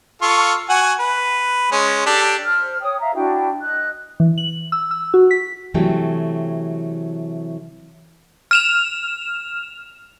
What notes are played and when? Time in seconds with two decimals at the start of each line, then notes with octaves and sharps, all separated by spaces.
0.22 F4 A4 C#6
0.69 F#4 F#5 G#5
1.00 B4
1.72 G#3 C#4
2.06 D4 G4 A4
2.45 C5 F6
2.81 C#5 G5 D#6
3.00 E5 F5 A#5
3.15 D4 E4 F#4 G5
3.61 D#5 F#6
4.20 E3
4.38 F#7
4.72 E6
4.91 E6
5.14 F#4
5.31 B6
5.74 C3 E3 F#3 G3 A3 G5
8.51 F6 E7 F7